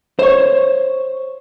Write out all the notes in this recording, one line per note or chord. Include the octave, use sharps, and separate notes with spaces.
C5 C#5